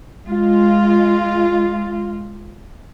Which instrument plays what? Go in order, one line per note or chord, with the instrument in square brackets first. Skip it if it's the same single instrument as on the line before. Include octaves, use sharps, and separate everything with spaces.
[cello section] G#3 F4